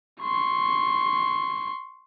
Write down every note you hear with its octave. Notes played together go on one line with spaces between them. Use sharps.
C6 C#6